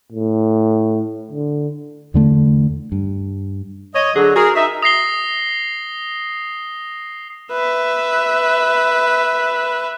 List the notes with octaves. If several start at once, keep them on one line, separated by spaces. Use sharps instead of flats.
A2
D3
E2 D3 A3
G2
C#5 D#5
D3 F#3 G#4
F#4 G#4 A#4
D#4 E5
D#6 A#6 C7 G7
B4 E5